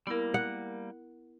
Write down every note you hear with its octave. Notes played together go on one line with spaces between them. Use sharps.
G3 A#3 B3 E4 A#4
F#5